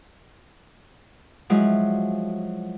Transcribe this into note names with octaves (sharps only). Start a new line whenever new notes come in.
F3 F#3 G#3 E4